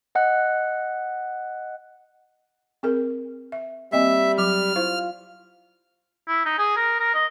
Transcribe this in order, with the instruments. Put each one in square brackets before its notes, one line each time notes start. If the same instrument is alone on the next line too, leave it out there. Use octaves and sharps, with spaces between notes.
[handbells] D#5 F#5 F#6
[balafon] C4 G#4 A#4
E5
[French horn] G3 [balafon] A#3 C4 D#5 [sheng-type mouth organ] E5
[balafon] F#3 D6 [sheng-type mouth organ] F6
[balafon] E4 C5 F5 [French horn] F4
[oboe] E4
D#4
G#4
A#4
A#4
D#5